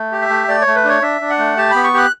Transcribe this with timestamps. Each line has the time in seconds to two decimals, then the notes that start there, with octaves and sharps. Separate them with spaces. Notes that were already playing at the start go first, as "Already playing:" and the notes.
Already playing: A3
0.12 G4
0.21 E5
0.29 A3
0.48 A3 D5
0.61 C#5
0.67 A3
0.75 B4
0.84 D4 C#5
1.02 D4 E5
1.21 D4
1.30 F#5
1.38 A3
1.57 G4 A5
1.71 B3 B5
1.84 C#6
1.93 G4 F#6